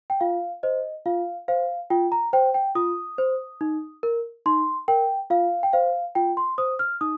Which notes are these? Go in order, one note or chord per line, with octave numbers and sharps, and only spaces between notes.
G5
F4 F5
C5 D#5
F4 F5
C5 F5
F4 G5
A#5
C5 G5
G5
F4 D#6
C5
D#4
A#4
D#4 C6
A#4 G5
F4 F5
G5
C5 F5
F4 G5
C6
C5 D#6
F6
D#4 D#6